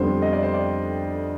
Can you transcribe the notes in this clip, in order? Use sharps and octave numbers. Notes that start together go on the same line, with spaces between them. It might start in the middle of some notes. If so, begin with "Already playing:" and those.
Already playing: F2 D3 G3 B3 D4 C5
D#5
D5
C5
D5